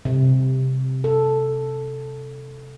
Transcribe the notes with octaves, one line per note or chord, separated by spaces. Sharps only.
C3
A4